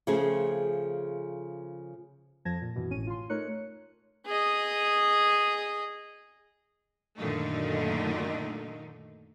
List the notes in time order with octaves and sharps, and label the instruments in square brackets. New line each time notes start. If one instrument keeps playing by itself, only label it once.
[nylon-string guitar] C#3 F3 A3 C4 G#4
[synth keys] F2 F3 A5 G#6 A#6
A#2
F#2 B2 E3
G#1 A2 C#4 D#7
F4 C6
A3 D#4 A#4 C#5 F#6 C#7
[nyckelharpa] G#4 D#5
[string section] F#2 A#2 D3 D#3 A3 D#4